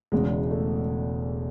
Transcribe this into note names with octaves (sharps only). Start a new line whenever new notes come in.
E1 E2 C#3 G#3
A3